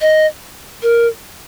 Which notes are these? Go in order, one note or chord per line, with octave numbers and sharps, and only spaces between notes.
D#5
A#4